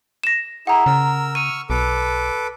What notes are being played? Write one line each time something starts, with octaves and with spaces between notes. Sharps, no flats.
A#6 E7
E4 G#4 F#5 A#5
C#3 A#4 E6
C#6 E6 F6 D#7
B1 A4 B4 D6